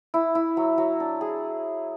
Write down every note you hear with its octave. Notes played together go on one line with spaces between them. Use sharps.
E4
E4
F#3
F#3
D4
G#4